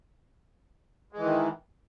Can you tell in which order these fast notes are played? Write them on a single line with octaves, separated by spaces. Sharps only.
G#3 E3 D#3